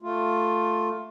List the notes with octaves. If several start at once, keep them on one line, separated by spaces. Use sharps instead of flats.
A3 F4